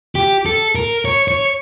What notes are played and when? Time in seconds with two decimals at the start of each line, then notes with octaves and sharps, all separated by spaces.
0.15 G4
0.46 A4
0.75 A#4
1.05 C#5
1.28 C#5